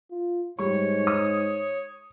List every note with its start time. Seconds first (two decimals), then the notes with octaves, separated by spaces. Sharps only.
0.11 F4
0.59 G#2 G3 C#5 C#6
1.07 D#6